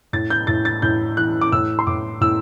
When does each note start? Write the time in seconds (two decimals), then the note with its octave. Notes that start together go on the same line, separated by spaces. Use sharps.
0.13 A2 A6
0.30 G6
0.47 A2 A6
0.65 A6
0.82 A2 G6
1.17 E3 F#6
1.41 D6
1.52 A2 E6
1.79 C6
1.87 A2 D6
2.21 A2 E6